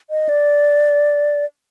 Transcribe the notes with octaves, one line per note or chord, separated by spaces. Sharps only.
D#5
D5